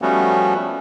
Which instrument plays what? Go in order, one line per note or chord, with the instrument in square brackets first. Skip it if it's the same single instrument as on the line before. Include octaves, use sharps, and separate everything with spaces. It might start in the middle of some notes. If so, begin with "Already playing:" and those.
[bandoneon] F3 G3 A3 B3 C#4 F#4